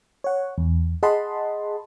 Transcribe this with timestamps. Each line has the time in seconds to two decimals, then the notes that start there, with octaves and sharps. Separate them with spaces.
0.24 C#5 F#5
0.58 E2
1.03 G#4 D#5 F#5 A5 B5 C6